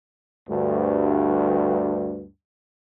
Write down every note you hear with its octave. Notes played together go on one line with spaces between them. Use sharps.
D2 G2